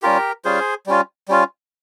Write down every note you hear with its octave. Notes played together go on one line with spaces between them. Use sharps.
G3 C#4 F4 G4 A#4
G3 C#4 F4 G#4 C5
G3 C#4 F4
G3 C#4 F4